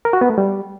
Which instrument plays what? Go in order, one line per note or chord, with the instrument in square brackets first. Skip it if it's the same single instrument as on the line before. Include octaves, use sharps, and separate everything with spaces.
[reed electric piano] A#4
F#4
B3
A3
G3